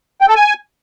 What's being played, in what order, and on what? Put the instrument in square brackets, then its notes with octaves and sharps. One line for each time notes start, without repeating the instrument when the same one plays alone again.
[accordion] G5
A4
G#5